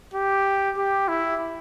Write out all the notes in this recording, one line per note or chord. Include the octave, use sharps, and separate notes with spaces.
G4
G4
E4